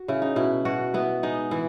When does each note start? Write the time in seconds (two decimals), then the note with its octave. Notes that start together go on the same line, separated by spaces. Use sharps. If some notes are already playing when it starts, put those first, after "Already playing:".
Already playing: F#4
0.08 C#3 E4
0.22 D#4
0.36 B2 E4
0.65 B2 F#4
0.94 B3 E4
1.23 G#3 D#4
1.51 E3 E4